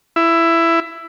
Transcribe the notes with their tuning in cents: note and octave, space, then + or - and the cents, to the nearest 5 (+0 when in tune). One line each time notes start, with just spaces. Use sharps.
E4 +15